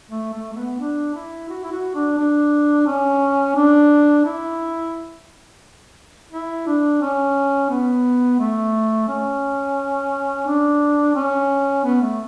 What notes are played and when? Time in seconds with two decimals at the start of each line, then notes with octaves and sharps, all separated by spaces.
0.10 A3
0.34 A3
0.53 A3
0.56 B3
0.80 D4
1.15 E4
1.49 F#4
1.64 E4
1.72 F#4
1.95 D4
2.18 D4
2.87 C#4
3.56 D4
4.25 E4
6.32 E4
6.67 D4
7.02 C#4
7.70 B3
8.40 A3
9.08 C#4
10.46 D4
11.15 C#4
11.84 B3
12.02 A3